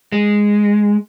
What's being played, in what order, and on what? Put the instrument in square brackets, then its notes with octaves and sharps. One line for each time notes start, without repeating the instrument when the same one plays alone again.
[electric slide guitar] G#3